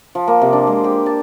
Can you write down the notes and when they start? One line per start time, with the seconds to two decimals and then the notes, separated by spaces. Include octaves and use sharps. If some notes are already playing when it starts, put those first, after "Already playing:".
0.15 F3
0.28 A#3
0.41 C3
0.53 D4
0.67 G#3
0.84 G4
1.06 A5